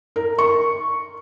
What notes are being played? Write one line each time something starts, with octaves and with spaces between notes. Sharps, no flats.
A#4
C#6